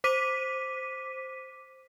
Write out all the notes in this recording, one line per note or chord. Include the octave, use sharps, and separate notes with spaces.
C5 D6 B6 D#7